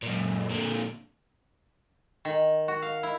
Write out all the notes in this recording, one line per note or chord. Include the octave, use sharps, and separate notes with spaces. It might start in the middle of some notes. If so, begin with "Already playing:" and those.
F#2 A#2
A#2 D3
D#3
F#4
F5
E4